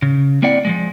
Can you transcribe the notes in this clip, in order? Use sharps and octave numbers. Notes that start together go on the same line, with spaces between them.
C#3
A#3 C4 E4 D5 F#5
F3 F#3 G#3